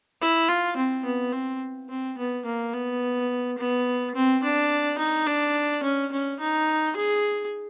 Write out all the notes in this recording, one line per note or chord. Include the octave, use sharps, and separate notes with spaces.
E4
F4
C4
B3
C4
C4
B3
A#3
B3
B3
C4
D4
D#4
D4
C#4
C#4
D#4
G#4